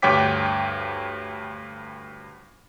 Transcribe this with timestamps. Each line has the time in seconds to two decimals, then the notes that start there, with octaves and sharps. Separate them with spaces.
0.02 D2 G2 C#5 G5 D6 B6